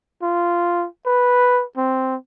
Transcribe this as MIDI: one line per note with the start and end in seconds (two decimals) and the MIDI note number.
0.22 0.87 65
1.06 1.64 71
1.77 2.16 60